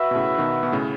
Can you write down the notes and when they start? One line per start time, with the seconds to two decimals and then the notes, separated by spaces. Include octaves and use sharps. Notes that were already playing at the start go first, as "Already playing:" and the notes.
Already playing: F#4 B4 E5
0.11 B2
0.15 A2 C#3
0.38 B2 D#3
0.63 B2
0.72 A2 C#3